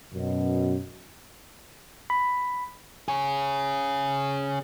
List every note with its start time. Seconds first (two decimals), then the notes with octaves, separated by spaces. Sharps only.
0.13 F#2 B2
2.10 B5
3.08 C#4 G#4